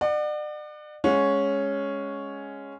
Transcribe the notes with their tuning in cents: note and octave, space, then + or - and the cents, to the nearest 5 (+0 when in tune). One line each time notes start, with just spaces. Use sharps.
D5 +40 F#5 +0
G#3 -5 C#4 +0 F#5 -35